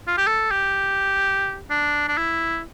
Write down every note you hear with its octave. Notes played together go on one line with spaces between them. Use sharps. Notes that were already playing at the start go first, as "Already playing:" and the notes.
F4
G4
A4
G4
D4
D4
E4